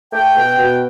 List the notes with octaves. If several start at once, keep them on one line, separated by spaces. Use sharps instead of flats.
A3 G5
B2
B2